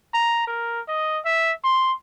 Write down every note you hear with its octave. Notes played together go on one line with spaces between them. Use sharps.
A#5
A#4
D#5
E5
C6